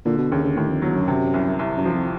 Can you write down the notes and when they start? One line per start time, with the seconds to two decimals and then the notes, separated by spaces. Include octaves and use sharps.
0.06 A#2 D3
0.18 B2
0.32 D#2 C#3
0.44 C#3
0.57 D#2 A2
0.70 F2
0.82 E2 F#3
0.96 F#2
1.08 C3
1.34 C2
1.59 C2
1.77 F#2
1.85 F3
1.94 F2